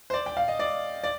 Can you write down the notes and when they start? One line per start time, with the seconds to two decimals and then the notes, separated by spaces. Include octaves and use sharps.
0.10 C5
0.14 D5
0.26 G5
0.37 F5
0.48 D#5
0.59 D5
1.04 D5